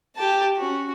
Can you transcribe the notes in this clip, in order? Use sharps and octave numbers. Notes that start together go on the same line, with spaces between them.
G4 A5
C#4 F#4